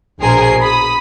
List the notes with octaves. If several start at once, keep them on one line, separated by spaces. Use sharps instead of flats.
A#1 B2 G#4 A#4 C5 C7
B5 D#6